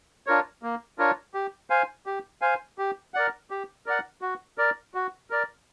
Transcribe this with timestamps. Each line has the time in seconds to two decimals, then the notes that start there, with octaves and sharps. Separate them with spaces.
0.27 D4 F4 A#4 C#5
0.63 A#3
0.98 D4 F4 A#4 C#5
1.34 G4
1.70 C5 F5 G#5
2.06 G4
2.42 C5 F5 G#5
2.78 G4
3.14 A#4 D5 F#5
3.50 G4
3.86 A#4 D5 F#5
4.22 F#4
4.58 A#4 D5
4.94 F#4
5.30 A#4 D5